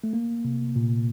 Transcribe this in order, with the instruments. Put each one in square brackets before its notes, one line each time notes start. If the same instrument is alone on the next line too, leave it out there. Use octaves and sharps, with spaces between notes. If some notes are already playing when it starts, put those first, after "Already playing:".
[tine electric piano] A3
A#3
C3
A#2